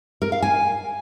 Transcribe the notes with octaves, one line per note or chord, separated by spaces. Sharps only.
A#4
F5
G#5